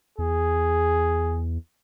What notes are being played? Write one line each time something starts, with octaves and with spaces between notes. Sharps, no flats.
E2 G#4